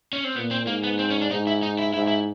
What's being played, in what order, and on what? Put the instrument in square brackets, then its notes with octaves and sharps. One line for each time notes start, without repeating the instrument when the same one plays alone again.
[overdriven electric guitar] C#4
C4
[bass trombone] A#2 [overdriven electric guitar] B3
[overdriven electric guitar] C4
[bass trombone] G#2 [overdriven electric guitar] A#3
[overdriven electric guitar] B3
C4
C#4
D4
[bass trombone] G#2 [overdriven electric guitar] D#4
[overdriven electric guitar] E4
D#4
E4
[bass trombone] G#2 [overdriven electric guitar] E4
[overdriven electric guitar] E4